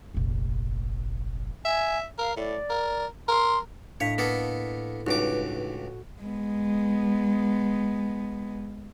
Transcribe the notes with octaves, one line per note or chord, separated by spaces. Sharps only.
F1 A#1
E5 G#5
A#4 F5
A2 D5
A#4
A#4 C6
A2 D4 C#5 D#5 F5 B6
A#3 B3 A4
C#2 G2 D#4 F#4 B4 D6
G#3 B3